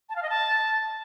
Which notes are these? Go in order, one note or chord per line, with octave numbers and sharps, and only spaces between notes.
A5
F5
D#5
A5